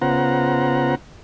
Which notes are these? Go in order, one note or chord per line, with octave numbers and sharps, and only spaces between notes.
C#3 B3 F4 C5 F#5 A#5